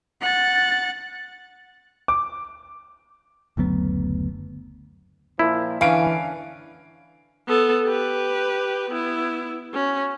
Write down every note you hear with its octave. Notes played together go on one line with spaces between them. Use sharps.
F#5 A6
D6
F#1 D2 F#3 B3
A#2 F3 E4 A#4
D3 E3 C#4 B4 F5 D7
B3 A4
G4 B4
B3 E4
C#4 F#4